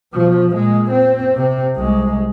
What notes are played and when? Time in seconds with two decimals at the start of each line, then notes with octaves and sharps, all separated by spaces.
0.14 B2 F3
0.53 A#2 G#3
0.91 C4
1.35 C3 C4
1.76 C2 G#3